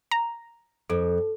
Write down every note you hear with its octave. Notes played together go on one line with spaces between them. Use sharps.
A#5
F2 A4